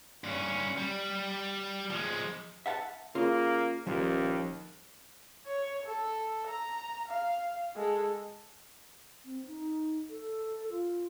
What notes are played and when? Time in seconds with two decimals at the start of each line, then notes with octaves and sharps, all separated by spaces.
0.24 G2 C#4
0.78 G3
1.90 F3 G#3
2.66 E5 F#5 A5
3.15 C#3 A#3 F4
3.87 D#1 D#2 F3 A#3
5.46 C#5
5.86 A4
6.47 A#5
7.08 F5
7.76 G#3 A4
9.25 C4
9.46 D#4
10.10 A4
10.70 F4